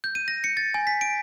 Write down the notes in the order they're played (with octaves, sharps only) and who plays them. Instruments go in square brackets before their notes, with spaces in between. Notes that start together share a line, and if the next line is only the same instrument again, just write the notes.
[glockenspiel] G6
D#7
A#6
C#7
A6
G#5
B6
D7